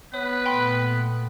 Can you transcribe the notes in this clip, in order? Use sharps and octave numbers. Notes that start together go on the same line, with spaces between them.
B3 B4 C#5
A#2 A3 G5 B5 C6